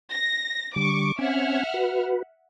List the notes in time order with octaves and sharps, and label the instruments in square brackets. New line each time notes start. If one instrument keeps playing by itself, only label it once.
[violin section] A#6
[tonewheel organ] D3 G3 [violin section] C#6 D6
[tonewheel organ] C4 C#4 G#5 [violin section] E5 F#5 F6
[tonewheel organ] F#4 B4